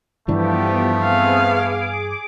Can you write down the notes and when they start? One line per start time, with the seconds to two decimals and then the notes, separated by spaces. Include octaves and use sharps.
0.28 G2 E3 F3 A3 B3 D4 G4
1.01 B3 C4 G#4 B4 F5
1.45 G#4 D6